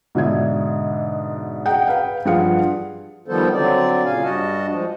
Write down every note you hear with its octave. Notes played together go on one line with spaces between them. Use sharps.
G#2 B2 D3 E5 G#6
G#4 F#5 G5 A#5
B4 F5 G5
G2 F3 G#4 F5 F#5 C#7
D#3 F3 G3 B3 A4 C5
D3 F#3 C4 D5
A#2 C#3 F5 G#5
G2 G3 F#4 D#5 F#5 A5
F3 G#3